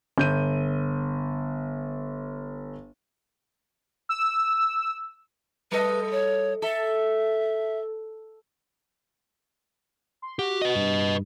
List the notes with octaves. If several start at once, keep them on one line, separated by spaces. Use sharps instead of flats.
G1 G6 D#7
E6
G3 A4 B4 D#5
C#5
A4 E5
C6
F#4 G4
B4 D#5
G2